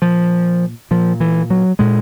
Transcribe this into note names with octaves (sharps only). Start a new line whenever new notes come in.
A#2 F3
A#2 F3
E3
F#3
A#2 G#3